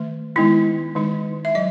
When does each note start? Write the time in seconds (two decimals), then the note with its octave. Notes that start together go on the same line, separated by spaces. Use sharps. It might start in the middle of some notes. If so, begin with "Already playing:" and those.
Already playing: D#3 A3
0.36 D#3 G#3 B3 D#4 E4
0.95 D#3 G#3 D#4
1.45 E5
1.55 F#3 D#5